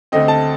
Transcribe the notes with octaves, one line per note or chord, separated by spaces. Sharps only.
D2 D3 A3 C4 D#5
A5